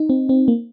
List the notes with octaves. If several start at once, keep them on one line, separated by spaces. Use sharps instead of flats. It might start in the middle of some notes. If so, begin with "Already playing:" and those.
Already playing: D#4
C4
C4
A#3